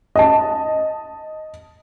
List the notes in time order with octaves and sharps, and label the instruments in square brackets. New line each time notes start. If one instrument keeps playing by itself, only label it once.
[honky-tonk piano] D#5 A5